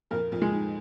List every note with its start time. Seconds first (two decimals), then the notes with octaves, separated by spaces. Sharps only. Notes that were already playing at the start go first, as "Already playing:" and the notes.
0.11 F2 A#2 A#4
0.31 F2 A#2
0.42 G#3
0.52 G#2